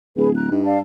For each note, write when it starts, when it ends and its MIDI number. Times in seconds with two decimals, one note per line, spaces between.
0.16 0.51 26
0.16 0.29 68
0.16 0.29 71
0.35 0.51 82
0.35 0.51 90
0.51 0.81 43
0.51 0.64 63
0.64 0.78 74
0.64 0.78 77
0.64 0.78 81